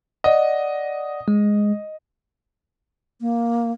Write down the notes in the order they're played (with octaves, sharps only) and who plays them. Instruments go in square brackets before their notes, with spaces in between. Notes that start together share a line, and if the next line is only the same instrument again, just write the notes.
[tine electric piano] D5 F#5 [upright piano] D#5
[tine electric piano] G#3
[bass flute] A#3